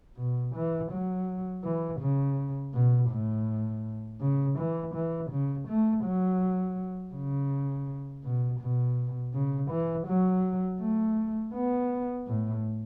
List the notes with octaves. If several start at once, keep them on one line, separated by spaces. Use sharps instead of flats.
B2
E3
F#3
E3
C#3
B2
A2
C#3
E3
E3
C#3
A3
F#3
C#3
B2
B2
C#3
E3
F#3
A3
B3
A2